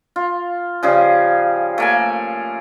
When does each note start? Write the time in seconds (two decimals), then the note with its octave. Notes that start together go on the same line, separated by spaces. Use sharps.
0.16 F4
0.83 C#3 F3 G3 G#4
1.78 A3 A#3 G#5